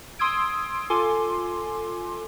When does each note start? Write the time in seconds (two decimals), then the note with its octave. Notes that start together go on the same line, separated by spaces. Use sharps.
0.19 C6 D#6 E6 G#6 D7
0.90 F4 A4 G#5 C6 D6